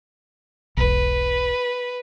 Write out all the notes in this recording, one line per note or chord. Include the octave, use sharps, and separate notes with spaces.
E1 B1 B4